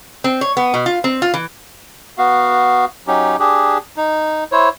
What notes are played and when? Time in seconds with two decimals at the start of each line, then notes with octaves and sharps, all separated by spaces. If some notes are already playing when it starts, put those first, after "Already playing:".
0.24 C4
0.41 C#5
0.57 B3
0.74 B2
0.86 F4
1.04 C4
1.22 F4
1.34 E3
2.18 B3 F#4 F5
3.07 F#3 C#4 D#4 G4
3.39 D4 G4 G#4
3.97 D#4
4.52 E4 C5 C#5